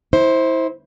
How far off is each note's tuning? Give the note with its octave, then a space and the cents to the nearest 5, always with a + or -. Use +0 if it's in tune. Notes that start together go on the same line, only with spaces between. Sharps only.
E4 -25 C5 +10